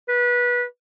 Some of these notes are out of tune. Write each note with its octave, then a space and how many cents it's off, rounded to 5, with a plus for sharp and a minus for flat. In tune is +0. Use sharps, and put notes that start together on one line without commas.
B4 -20